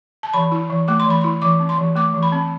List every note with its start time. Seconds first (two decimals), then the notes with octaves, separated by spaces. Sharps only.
0.23 A5
0.34 E3 B5
0.52 E4
0.70 E3
0.88 A3 D6
1.00 C6
1.06 E3 B5
1.21 C6
1.24 E4
1.42 E3 D6
1.60 C4
1.69 C6
1.78 E3
1.96 A3 D6
2.14 E3
2.23 B5
2.32 C4